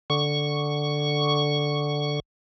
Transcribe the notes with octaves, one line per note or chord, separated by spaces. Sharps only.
D3 C#6